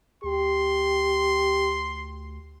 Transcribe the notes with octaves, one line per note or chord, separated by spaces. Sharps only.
D2 G4 C6